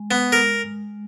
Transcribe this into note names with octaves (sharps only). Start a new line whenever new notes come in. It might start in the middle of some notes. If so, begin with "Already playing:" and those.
Already playing: G#3
B3
A#4